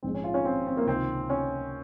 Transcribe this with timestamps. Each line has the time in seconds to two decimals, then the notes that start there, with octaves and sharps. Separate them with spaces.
0.03 A#1 G#2 F3 G#3 C4
0.14 C#4
0.24 F4
0.34 C#4
0.45 C4
0.66 C4
0.77 A#3
0.87 C#2 C3 D#3 C4
1.30 C#4